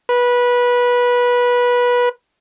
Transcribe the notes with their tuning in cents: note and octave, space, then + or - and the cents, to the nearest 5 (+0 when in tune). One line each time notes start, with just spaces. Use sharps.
B4 -20